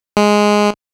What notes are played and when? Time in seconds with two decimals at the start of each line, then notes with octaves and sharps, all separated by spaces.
0.17 G#3